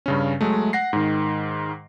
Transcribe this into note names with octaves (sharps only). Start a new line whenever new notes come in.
G2 C#3 C#4
F#3 G#3 A3
F#5 A#6 C7
G#2 D#3